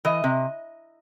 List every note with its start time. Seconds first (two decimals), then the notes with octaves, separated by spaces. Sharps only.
0.05 E3 D#5
0.24 C3